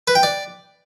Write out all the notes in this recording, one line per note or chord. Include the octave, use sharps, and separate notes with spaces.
B4
G5
D5